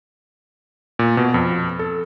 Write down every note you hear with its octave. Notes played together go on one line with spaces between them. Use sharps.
A#2
B2
F2
A4